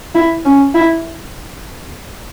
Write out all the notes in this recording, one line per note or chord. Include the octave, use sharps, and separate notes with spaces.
E4
C#4
E4